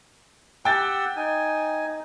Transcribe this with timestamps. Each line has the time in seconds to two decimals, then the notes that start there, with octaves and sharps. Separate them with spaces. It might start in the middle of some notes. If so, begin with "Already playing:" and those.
0.65 G4 F#5 G5 E6 A6
1.16 D#4 G#5
1.86 D#4